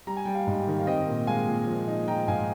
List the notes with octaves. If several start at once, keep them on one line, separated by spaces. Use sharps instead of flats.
G3 A#5
G#5
G3 G5
F5 G#5
G#2
D#3
F5
C4 D#5 G5
A#2
G#3 F5 G#5
A#2
F3
D#4
F3 G5 A#5
G#2 F5 G#5